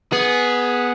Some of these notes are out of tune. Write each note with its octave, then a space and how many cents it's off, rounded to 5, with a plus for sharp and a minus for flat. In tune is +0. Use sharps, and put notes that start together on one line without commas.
B3 -5 G#4 +5